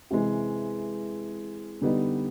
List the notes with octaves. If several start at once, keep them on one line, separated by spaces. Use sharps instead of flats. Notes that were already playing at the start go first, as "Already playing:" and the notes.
C3 E3 G#3
D3 G3 B3 D#4